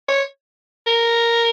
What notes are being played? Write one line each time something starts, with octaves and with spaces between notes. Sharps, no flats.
C#5
A#4